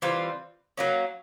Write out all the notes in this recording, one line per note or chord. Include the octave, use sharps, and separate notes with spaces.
E3 G3 C4 F4
F#3 A#3 C#4